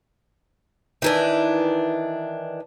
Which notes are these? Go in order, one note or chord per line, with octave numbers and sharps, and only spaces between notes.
D#3 E3 D4